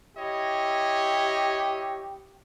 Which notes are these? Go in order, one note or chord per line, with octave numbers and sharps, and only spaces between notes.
E4 G4 C#5 D#5